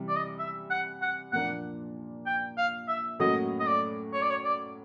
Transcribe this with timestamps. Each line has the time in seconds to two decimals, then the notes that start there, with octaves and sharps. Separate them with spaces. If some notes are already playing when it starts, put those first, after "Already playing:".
Already playing: C3 E3 G3
0.08 D5
0.16 D#5
0.39 E5
0.71 F#5
1.02 F#5
1.33 A#2 F3 A#3 D4 F#5
2.26 G5
2.57 F5
2.88 E5
3.20 A2 F#3 A#3 C#4 F#4 D#5
3.60 D#5
3.66 D5
4.13 C#5
4.22 D5
4.30 C#5
4.45 D5